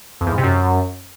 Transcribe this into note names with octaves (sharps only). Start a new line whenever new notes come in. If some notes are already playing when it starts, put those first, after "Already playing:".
F2
E2
G#2
C3
F#2